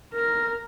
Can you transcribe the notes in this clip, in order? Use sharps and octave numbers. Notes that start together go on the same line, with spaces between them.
A#4